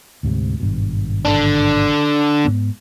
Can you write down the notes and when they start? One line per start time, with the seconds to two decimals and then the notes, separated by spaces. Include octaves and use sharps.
0.23 D2 G#2 C3
0.60 G#1 G2 B2
1.25 D3 D4
2.45 G#2 B3